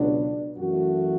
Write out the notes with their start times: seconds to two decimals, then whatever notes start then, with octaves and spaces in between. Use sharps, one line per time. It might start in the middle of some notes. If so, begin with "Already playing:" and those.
Already playing: C#2 B2 F#3 B3 D4
0.58 F#2 E3 A3 F#4